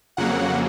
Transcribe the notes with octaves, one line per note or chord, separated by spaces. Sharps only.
F2 C#3 F#3 A#3 F#5